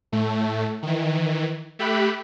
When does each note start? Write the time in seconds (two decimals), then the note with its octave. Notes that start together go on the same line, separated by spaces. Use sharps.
0.12 A2 A3
0.83 D#3 E3
1.79 A3 G4 E5 B5 F#6